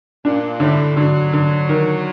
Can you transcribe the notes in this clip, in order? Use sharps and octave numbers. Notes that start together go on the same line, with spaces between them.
A#2 D4
A2 D3
D3 F#3
D3
D#3